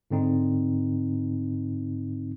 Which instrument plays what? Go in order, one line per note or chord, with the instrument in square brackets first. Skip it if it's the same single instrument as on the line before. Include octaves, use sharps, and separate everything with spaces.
[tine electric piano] G#2 D3 C4 D#4